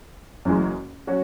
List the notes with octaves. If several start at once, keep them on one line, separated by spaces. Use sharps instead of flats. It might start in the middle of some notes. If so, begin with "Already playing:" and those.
F#1 F#2 E3 G#3
F#3 C#4 F#4